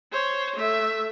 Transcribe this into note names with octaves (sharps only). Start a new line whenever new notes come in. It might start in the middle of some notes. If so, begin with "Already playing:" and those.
C5 C#5
A3 E5